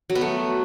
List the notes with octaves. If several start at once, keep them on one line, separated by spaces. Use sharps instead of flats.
F#3
B3
A3